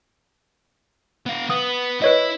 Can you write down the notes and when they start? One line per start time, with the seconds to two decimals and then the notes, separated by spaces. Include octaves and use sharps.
1.26 B3 F5
1.50 B3 D#6
2.02 E4 B4 C#5 D#5